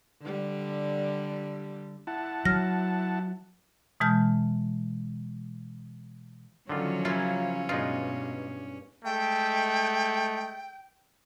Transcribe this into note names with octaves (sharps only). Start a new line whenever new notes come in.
D3 G3
E4 F#5 A5
F#3 F6 A#6
B2 E3 G#3 A5 F6 G6
D3 D#3 F3 F#3 C#4 F4
C#3 A#3 E4 F4
G2 B2 G#3 D#4 F4
G#3 A3 G5